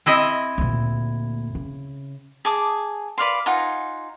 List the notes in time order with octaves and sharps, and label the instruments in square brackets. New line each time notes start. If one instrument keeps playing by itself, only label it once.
[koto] C4 E4 D#5
[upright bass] D2 A#2
C#3
[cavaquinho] G#4 A5 D6 D#6
B4 D5 F5 C6
D#4 F4 F#5 G#5